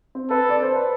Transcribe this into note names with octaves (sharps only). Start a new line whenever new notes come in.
C4
A4 B4
D5
C5
B4